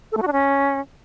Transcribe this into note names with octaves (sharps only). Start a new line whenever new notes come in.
A4
A3
F#4
D4
C#4